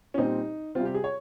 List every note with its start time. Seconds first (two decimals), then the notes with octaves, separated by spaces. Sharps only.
0.14 C#4
0.18 A#2 G3 C4 D#4
0.75 C3 G3 C4 F4
0.85 G4
0.94 G#4
1.04 C#5